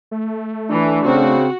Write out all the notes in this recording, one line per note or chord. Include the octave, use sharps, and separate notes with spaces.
A3
E3 D4
C#3 C4 F#4